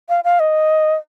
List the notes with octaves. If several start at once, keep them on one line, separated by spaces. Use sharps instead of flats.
F5
F5
D#5